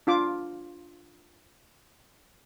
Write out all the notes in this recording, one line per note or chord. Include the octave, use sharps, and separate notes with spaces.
D4 F4 D6